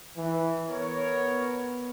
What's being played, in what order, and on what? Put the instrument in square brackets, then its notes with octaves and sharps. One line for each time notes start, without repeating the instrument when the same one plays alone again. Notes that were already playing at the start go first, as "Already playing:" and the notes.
[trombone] E3
[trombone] B3 [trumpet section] A#4 C#5